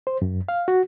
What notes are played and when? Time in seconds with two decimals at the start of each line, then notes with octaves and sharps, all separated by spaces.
0.07 C5
0.22 F#2
0.48 F5
0.68 F#4